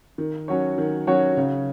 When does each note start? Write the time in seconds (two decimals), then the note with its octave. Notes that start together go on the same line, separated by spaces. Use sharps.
0.18 D#3
0.48 F#3 C#4 F#4 C#5
0.78 D#3
1.07 F#3 C#4 F#4 C#5
1.37 C#3